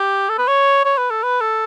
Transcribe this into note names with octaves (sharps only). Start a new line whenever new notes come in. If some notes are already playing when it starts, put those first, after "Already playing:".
Already playing: G4
A4
B4
C#5
C#5
B4
A4
B4
A4